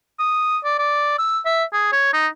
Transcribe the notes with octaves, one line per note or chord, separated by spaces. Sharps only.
D#6
D5
D5
E6
E5
G#4
C#5
D#4